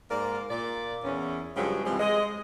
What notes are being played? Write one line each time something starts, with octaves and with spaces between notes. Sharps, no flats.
G#2 A#3 A#4 D5
A#2 D5
E2 C#4
G2 C#3 F3 F#3 G#3 G4
C3 E3 F3 G3 G#3 C4
G#3 D#5